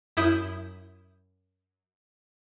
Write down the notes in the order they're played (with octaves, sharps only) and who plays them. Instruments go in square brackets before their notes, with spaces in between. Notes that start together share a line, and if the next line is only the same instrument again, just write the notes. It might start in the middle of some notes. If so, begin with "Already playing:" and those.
[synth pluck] F#2 E4 D#6 G6